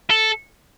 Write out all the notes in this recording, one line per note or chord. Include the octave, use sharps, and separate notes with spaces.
A4